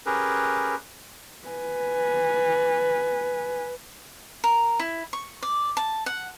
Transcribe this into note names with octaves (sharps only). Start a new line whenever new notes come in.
C#4 G4 G#4 A#4 B4
B4 G#5
A#4
E4
C#6
D5
A5
F#5